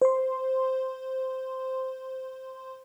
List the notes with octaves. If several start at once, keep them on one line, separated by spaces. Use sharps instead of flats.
C5 C6